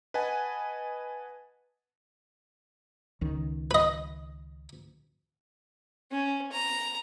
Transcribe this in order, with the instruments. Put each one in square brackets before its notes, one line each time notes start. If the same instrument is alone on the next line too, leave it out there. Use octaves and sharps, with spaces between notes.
[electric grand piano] B4 D#5 F#5 G#5 A5
[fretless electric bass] C#2 D#3
[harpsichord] B4 D#5
[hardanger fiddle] C#4
A#5